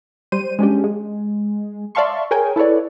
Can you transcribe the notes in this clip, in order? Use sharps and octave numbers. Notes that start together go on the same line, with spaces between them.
G3 C5 D#7
G#3 C#4 D4 G4
G#3
D5 E5 F5 A5 C6 C#6
G#4 A#4 C#5 G5 G#5
E4 A4 B4 C#5 D5